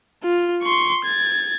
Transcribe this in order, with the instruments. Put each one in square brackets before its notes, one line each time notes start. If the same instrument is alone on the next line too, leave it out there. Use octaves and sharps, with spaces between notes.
[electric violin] F4
C6 C#6
G#6 A6